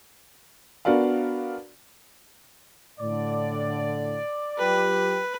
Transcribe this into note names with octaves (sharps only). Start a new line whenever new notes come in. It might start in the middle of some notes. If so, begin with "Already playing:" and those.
B3 D4 F#4 A#4 D5 F5
A2 D3 D5
F#3 F4 G4 B4